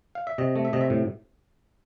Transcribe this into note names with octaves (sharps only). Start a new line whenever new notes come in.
F5
E5
C3 D#5
A3
E5
C3 D#5
E5
A2